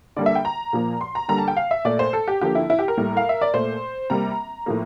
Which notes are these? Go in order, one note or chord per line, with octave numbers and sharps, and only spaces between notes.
D3 G3 A#3 D5
E5
G5
A#5
A#2 F3 A#3
C6
A#5
D3 G3 A#3 A#5
A5
G5
F5
E5
A#2 A3 D5
C5
A4
G4
D3 F3 A#3 G4
E4
E4
G4
A#4
A2 G3 A#3
F5
E5
D5
A#2 A3 C5
C3 G3 A#3 A#5
A2 F3 A#3